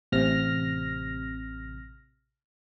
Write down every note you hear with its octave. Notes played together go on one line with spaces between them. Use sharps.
A1 C3 F6 A#6